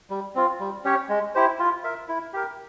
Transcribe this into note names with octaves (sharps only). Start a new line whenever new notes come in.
G3
C4 F4
G3
C#4 G4 C#5
G#3
E4 G4 C5
F4
A#4 E5
E4
G4 A#4